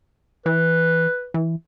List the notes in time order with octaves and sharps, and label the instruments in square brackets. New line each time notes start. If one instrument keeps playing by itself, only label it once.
[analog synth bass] E3 [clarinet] B4
[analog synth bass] E3